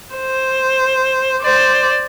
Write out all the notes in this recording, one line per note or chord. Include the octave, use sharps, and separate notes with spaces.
C5
C5 D5